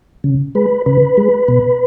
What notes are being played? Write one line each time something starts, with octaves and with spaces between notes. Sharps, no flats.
C#3
G#3 B4
C#3 B4
G#3
B2